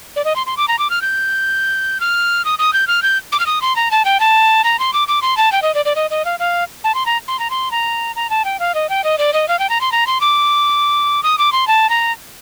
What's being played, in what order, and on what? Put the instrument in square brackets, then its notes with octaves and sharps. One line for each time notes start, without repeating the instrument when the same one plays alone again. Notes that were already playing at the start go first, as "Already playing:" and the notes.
[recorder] D5
D#5
C6
C6
D6
A#5
D6
F6
G6
F6
D#6
D#6
G6
F6
G6
D6
F6
D#6
C6
A#5
A5
G5
A5
A#5
C6
D6
D6
C6
A5
G5
D#5
D5
D5
D#5
D#5
F5
F5
A5
C6
A#5
C6
A#5
C6
A#5
A#5
A5
G5
F5
D#5
G5
D#5
D5
D#5
F5
G5
A#5
C6
A#5
C6
D6
D#6
D6
C6
A5
A#5